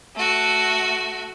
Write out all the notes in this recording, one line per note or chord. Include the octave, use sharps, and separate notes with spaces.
A3 F#4